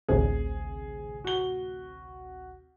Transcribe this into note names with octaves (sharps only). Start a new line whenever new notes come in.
A1 D2 C3 G#4
F#4 G7